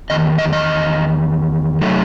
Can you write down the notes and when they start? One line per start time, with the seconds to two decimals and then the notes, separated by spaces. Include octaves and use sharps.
0.10 E2 D#3 D#5
0.38 D#5
0.53 D#5
1.82 C3 F#3 A3 D#4